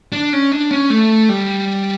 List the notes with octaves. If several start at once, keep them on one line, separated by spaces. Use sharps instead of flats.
D4
C#4
D4
C#4
A3
G3